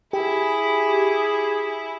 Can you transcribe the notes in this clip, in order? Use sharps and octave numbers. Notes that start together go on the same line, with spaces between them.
E4 G4 G#4